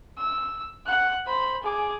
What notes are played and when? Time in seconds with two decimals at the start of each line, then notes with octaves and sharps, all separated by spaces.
0.18 E6
0.86 F#5 F#6
1.26 C5 B5
1.63 G#4 D6